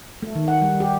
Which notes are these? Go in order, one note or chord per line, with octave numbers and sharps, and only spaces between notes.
A3
D#3
F#5
G3
G4